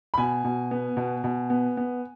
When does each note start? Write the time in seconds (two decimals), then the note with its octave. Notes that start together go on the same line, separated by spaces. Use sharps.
0.14 B5
0.18 B2 G#5
0.44 B2
0.71 B3
0.97 B2
1.24 B2
1.50 B3
1.77 B3